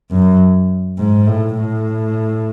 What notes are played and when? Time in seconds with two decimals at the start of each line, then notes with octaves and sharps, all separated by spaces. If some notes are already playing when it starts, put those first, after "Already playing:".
0.11 F#2
0.98 G#2
1.27 A2
1.57 A2